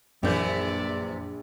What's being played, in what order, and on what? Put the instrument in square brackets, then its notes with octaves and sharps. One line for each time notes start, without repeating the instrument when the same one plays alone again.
[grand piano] A#1 A#3 G6 [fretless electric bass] F#2 [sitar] C3 E3 [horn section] D5